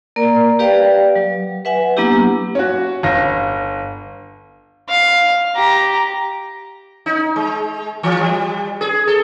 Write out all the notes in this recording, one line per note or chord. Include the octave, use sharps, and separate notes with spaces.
A#3 A#4 D5
G4 B4 D5 F5 G5
F#3
B4 E5 F#5 G#5
F#3 A#3 B3 D4 E4 G4
C#4 F#4
G1 F5 A#6
F5
G4 A#5
D#4
G#3
E3
G3
G#4
A4